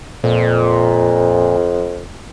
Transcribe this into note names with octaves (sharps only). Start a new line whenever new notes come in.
F2 A#2